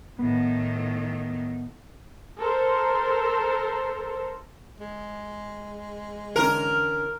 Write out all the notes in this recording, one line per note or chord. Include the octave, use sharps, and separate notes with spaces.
A2 D#3 B3
A4 A#4 C5
G#3
D3 E3 C#4 A#4